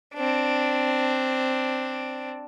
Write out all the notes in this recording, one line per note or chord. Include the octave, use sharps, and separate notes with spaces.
C4 D4